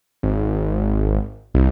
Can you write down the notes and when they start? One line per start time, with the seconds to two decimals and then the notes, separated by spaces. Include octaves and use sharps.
0.23 G#1
1.54 C2